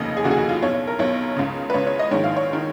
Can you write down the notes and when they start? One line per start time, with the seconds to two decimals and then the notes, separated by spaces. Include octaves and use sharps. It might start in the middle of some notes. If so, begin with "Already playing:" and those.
Already playing: F1 D#2 C#3 D#5
0.17 G#4
0.24 F1 D#2 C#3 F#4
0.31 G#4
0.37 F#4
0.49 F4
0.63 B1 B2 C#5
0.74 C#5
0.87 A#4
0.99 B1 B2 C#5
1.36 C#2 C#3
1.70 B4
1.74 C#2 C#3 C#5
1.87 C#5
1.99 D#5
2.11 A#1 G#2 D#3 C#5
2.24 F5
2.37 C#5
2.53 D#3